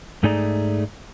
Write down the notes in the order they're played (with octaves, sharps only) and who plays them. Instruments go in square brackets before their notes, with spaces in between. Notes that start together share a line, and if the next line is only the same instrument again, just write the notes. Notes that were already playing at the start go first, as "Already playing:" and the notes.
[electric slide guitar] G#2 A3 D#4 G#4 D5 A#5